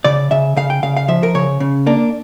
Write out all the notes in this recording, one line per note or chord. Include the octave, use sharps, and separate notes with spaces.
C#3 D5
C#3 E5
C#3 F5
G5
C#3 F5
F5
F3 E5
A#4
C#3 C#5
C#3
A#3 D4